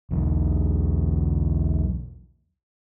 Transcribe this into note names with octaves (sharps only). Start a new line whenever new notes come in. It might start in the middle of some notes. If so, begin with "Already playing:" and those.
B1 E2